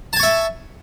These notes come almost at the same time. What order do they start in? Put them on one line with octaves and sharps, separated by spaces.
A5 G#5 C#6 E5